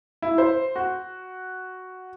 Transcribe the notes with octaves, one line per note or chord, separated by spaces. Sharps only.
E4
C5
F#4